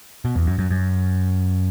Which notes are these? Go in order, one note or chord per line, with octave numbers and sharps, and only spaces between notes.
B2
E2
F#2
F#2
F#2